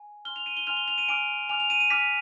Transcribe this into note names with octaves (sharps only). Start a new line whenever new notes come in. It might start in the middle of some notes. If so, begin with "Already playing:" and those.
Already playing: G#5
G#5 C6 F6 G7
F7
D#7
G7
G#5 C6 F6 F7
G7
F7
D#7
G#5 D6 F6 D7
G#5 D6 F6 F7
F7
D#7
D#7
G#5 D6 F6 B6